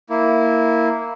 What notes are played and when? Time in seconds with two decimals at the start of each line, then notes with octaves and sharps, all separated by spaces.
0.10 A#3 E4